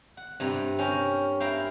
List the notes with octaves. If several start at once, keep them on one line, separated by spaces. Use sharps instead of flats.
F#5
G2 C3 A#5
C#4 G4 A#4
E4 A#4 C5 F5 G5